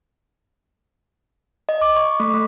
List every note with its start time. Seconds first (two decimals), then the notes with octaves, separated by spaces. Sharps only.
1.69 D#5
1.82 D6
1.96 C#6
2.20 A3
2.34 A3